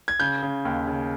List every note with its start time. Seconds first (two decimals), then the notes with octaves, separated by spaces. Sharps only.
0.08 G#6
0.20 C#3 G6
0.43 C#3
0.65 D#2
0.88 C#3